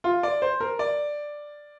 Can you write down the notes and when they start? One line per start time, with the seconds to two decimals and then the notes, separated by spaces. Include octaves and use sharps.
0.04 F4
0.23 D5
0.42 C5
0.60 A#4
0.79 D5